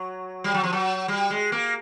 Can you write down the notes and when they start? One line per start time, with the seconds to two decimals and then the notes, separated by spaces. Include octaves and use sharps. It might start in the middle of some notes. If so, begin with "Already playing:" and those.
Already playing: F#3
0.44 G3
0.54 F#3
0.63 F3
0.73 F#3
1.08 G3
1.30 G#3
1.52 A#3